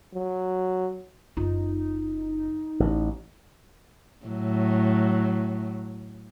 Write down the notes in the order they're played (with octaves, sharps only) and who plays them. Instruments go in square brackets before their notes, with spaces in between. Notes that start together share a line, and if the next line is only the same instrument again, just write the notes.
[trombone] F#3
[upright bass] F#1 F4 [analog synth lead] D#4
[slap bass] A1
[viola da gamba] A2 F#3